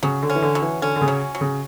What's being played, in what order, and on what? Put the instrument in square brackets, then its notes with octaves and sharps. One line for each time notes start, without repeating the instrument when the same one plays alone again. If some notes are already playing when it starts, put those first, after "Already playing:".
[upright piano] C#3 [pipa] F#3
[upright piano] D3
[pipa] C#4
[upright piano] E3
D3
[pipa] F#3
[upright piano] E3
[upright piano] D3 [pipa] C#4
[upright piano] D3
C#3
[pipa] F#3
F#3
[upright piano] C#3